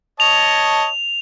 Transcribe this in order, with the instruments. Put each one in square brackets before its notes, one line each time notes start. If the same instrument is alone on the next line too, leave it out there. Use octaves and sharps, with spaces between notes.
[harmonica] C#5 D#5 A5 [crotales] F7